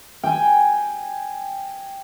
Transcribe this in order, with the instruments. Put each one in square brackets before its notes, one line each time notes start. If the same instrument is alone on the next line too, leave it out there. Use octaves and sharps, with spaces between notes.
[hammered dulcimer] G5 G#5